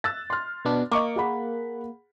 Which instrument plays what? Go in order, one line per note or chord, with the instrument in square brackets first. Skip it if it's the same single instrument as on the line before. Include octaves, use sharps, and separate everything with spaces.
[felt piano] E6 F#6 A6
C6 F6
[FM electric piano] B2 B3 D4
[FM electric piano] A#3 [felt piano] D#5 C#6 D6
[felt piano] G#4 F#5 B5